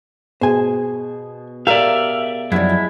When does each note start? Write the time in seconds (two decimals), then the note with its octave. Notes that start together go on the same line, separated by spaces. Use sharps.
0.41 B2 G#4 C5 G#5
1.67 G4 A#4 D5 E5 F5
2.52 F#2 F3 G3 G#3 E4